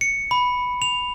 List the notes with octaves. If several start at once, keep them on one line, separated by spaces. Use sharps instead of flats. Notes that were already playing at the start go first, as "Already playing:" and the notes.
C#7
B5
F7